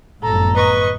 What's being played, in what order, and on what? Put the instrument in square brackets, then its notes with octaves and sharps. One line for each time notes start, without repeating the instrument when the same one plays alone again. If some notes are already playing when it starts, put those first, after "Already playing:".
[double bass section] G1 F#2 A2 [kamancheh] A4 [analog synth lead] A#5
[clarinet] B4 [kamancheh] D#5 C#6